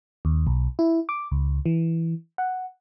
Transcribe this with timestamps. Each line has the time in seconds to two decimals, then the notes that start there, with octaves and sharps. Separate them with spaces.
0.25 D#2
0.47 B1
0.79 E4
1.09 D6
1.31 C#2
1.66 E3
2.38 F#5